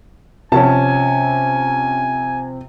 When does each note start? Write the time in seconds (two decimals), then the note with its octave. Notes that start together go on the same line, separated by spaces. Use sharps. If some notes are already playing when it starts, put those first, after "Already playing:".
0.52 C3 F3 C4 C#4 G#5 A5